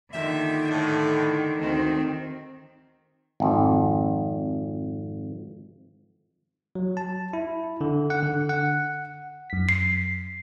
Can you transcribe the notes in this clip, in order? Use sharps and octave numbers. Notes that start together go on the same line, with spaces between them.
A#2 D3 D#3 G4 E5
A2
D2 D#3 C4
G#1 F2
F#3
A5
E4
D3
F#5
D3
F#5
F#2 B6
C7